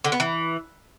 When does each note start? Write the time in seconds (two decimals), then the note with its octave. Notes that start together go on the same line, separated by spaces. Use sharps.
0.04 D3
0.12 B3
0.20 E3